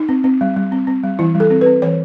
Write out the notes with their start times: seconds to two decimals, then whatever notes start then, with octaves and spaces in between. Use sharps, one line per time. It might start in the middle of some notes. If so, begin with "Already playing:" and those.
Already playing: D#4
0.09 C4
0.24 C4
0.41 G3
0.56 G3
0.72 C4
0.87 C4
1.03 G3
1.19 E3 E4
1.35 G3
1.40 A4
1.50 C4
1.61 C4 B4
1.82 E3 C#5